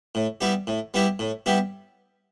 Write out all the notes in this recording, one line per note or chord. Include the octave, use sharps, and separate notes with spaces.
A2
G3 B3 E4 G4
A2
G3 B3 E4 G4
A2
G3 B3 E4 G4